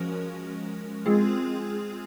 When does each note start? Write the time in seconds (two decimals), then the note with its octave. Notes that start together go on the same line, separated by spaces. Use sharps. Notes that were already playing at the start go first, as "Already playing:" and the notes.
Already playing: F3 G#3 C#4 F#4 A#4
1.06 G#3 C4 F4 G#4